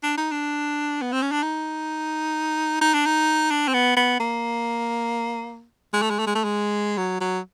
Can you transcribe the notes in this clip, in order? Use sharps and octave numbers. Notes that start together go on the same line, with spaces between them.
D4
D#4
D4
B3
C4
C#4
D4
D#4
D#4
D4
D#4
D4
C4
B3
B3
A#3
G#3
A3
G#3
A3
G#3
A3
G#3
F#3
F#3